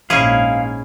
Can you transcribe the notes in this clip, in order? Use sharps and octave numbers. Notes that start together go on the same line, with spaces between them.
A#1 G#2 C#4 E4 G#4 F5 B5